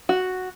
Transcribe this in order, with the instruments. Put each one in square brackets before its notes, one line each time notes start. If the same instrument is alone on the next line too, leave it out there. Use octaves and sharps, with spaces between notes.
[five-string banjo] F#4